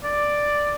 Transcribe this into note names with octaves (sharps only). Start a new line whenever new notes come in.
D5